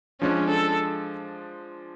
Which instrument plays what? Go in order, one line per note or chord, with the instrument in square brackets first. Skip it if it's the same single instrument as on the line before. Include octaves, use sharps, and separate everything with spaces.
[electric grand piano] F3 G#3 D4 [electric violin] C#4
[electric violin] A4